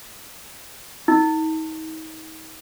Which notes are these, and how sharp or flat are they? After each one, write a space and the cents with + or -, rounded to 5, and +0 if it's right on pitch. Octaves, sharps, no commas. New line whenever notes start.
D#4 +35